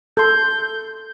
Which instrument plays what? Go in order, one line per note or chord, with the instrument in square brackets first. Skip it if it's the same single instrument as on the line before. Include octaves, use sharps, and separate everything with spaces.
[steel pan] A4 C6 [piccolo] G6